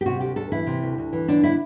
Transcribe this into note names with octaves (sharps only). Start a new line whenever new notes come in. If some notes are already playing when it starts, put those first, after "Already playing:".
G4
C3 F#4
D2 G4
D2 A4
E3 E4
C3
D2
D2
E3
D3 D4
E4